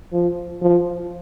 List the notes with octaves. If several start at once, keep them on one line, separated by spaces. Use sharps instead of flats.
F3
F3